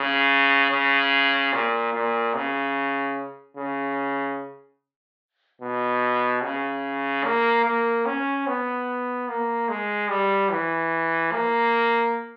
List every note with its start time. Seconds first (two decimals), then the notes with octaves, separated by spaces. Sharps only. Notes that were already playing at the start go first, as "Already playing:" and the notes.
Already playing: C#3
0.71 C#3
1.53 A#2
1.94 A#2
2.35 C#3
3.57 C#3
5.61 B2
6.43 C#3
7.24 A#3
7.65 A#3
8.06 C#4
8.47 B3
9.29 A#3
9.69 G#3
10.10 G3
10.51 E3
11.32 A#3